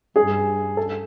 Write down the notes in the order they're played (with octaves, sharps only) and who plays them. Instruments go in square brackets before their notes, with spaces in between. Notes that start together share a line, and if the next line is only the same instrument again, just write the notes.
[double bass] G2 [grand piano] G#4
[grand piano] A4